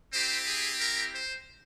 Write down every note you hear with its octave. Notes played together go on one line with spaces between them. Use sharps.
C4 E4 G4 C5
G#4
A#4
C5